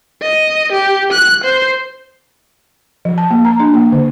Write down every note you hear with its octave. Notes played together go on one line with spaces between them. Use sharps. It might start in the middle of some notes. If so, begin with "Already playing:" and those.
D#5
G4
F#6
C5
F3
A5
A#3
A#5
D4
A#3
D3